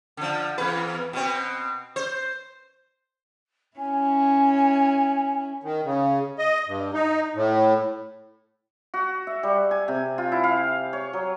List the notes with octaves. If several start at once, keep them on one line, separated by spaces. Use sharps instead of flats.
D3 F3
E2 B4
B2 C4
C5
C#4 E4 G#5
D#3
C#3
D#5
G2
D#4
A2
F#4
E5
G3
G#5
C3
F4
E4
F5
C#5
F#3